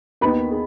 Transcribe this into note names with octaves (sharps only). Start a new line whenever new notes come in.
D#2 D#3 B3 D#4 B4 B5
G#4